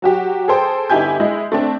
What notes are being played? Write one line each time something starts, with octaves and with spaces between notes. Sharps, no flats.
F#3 F#4 G4
G#4 A4 C5 G5
G1 D#4 E4 G4 G#5 G6
G#3 E4 G#4 D#5
A3 C4 D4